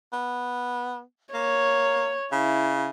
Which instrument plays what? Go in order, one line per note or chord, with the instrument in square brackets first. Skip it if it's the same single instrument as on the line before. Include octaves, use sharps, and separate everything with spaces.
[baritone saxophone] B3
[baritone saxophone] A#3 [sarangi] C#5
[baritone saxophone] C#3 [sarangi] E4